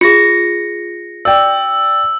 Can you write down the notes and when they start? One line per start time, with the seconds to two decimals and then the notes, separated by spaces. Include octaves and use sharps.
0.01 F4 G#4 A#6 C#7
1.25 D5 G5 E6